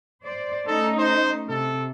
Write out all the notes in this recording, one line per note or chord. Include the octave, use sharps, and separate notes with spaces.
C5 D5
A3 C#4 D#4 A4
C5
C3 A4